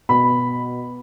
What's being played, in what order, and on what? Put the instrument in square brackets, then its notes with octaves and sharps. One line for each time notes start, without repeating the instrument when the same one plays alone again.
[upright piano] B2 B5